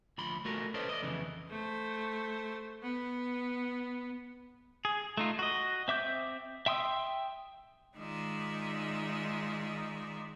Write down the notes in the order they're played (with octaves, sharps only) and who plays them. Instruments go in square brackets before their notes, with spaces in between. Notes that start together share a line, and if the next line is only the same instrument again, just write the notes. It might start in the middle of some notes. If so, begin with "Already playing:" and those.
[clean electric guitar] D2 F3 B5 C6
A3 F#4 A#4
C#4 A4 B4 C5 D5 D#5
D5 D#5
F2 C#3 E3
[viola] A3 C5
B3
[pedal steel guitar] G#4
A3 D#4 F4
F#4 D#5
C4 E5 D6 G6
E5 G5 C6 D#6 E6
[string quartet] D#3 G#3 D#4 F4 D5 E5